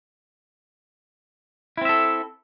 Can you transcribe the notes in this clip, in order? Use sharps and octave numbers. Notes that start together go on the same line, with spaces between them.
C4 E4 A4 E5